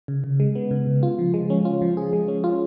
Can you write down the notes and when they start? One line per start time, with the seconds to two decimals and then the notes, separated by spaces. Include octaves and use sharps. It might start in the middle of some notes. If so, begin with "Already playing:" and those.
0.08 C#3
0.24 C#3
0.40 G#3
0.55 B3
0.71 C#3
0.87 C#3
1.03 F4
1.19 F3
1.34 G#3
1.50 C#4
1.65 F4
1.82 F3
1.97 G#4
2.13 G#3
2.28 C#4
2.44 F4